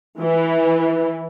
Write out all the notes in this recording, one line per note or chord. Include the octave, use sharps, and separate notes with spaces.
E3